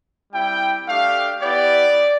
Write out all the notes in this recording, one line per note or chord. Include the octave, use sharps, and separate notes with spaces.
G3 C4 E4 G5
A3 D4 G4 F5
B3 E4 G4 D5